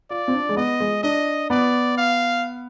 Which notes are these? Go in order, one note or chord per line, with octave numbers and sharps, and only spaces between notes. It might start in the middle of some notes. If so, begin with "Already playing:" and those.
F4 D5
C4
D4
G#3
B3 D#5
G#3
D4 D#5
B3 D5
F5